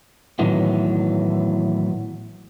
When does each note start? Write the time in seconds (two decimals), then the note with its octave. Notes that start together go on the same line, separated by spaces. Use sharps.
0.39 A2 D#3 E3 F#3 A3 B3